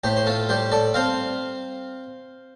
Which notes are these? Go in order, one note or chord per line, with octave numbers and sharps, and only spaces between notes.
A2 G4 C5
C5
F4 A4
G3 G4 C5
A4 D5
C4 C5 F5